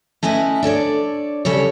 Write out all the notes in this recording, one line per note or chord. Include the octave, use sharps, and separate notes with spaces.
A3 C#4 E4 B4 D#5
D4 A4 C#5 D5
C#3 G3 A4 C#5